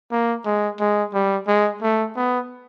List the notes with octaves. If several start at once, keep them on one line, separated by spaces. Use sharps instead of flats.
A#3
G#3
G#3
G3
G#3
A3
B3